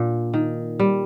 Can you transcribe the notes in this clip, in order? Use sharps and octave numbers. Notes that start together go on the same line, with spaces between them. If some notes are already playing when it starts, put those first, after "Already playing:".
Already playing: A#2 D4
D#3
G3